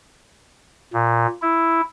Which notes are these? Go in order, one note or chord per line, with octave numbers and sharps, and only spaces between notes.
A#2
E4